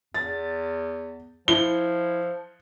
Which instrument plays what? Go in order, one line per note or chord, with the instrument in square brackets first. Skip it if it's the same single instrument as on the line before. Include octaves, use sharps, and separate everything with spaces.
[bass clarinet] E2 [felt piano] A6
[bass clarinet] F3 [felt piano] E4 [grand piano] G7